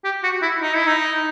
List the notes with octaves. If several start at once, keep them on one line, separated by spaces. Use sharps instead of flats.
G4
F#4
E4
D#4
E4
D#4